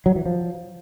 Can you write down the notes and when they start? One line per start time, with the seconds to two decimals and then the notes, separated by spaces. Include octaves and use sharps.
0.06 F#3
0.16 E3
0.26 F3